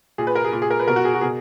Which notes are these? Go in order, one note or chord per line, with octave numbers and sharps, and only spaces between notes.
A#2 G#4
B4
A#4
G#4
A#2
G#4
A#4
B4
B2 A#4
F#4
G#4
F#4
B2 G#4